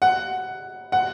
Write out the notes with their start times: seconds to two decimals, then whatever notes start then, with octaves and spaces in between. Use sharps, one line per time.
0.02 F#5
0.92 F#5